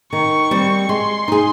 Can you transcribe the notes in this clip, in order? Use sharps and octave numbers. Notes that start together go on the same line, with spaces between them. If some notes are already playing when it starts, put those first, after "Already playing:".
D#3 C#6
G3 C4
G#3 C6
D#4 G#4